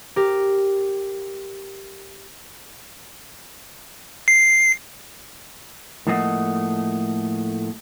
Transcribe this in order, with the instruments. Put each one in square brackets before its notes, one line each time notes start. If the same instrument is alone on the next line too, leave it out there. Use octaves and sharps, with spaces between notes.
[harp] G4 A#4
[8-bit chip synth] C7
[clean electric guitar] A2 F3 A3 A#3 D#5 F#5